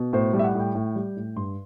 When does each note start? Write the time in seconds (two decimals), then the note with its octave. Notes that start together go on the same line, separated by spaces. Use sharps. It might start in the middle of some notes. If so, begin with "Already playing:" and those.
Already playing: B2
0.13 A2 C5
0.34 G3
0.39 E5
0.44 F#5
0.55 A2 G5
0.75 A2
0.96 G3
1.17 A2
1.36 G2 C6